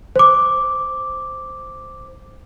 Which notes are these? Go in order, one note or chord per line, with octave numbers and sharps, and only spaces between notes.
C5 D6